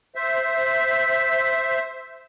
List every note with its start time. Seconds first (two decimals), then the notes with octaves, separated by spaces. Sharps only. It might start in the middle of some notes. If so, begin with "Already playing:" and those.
0.15 C5 E5